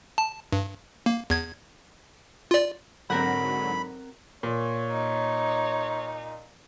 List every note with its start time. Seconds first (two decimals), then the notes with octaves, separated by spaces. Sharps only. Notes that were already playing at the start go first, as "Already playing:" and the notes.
0.18 A5
0.52 G2
1.06 A#3
1.30 E2 G#6
2.51 F4 D5
3.10 G#2 D3 F#3 C4 A#4 F#5 B5
4.43 A#2 C#5
4.91 D#4